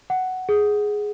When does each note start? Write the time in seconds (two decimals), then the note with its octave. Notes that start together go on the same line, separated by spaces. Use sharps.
0.10 F#5
0.49 G#4